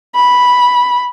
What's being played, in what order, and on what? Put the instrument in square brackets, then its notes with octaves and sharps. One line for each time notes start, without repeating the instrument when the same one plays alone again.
[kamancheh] B5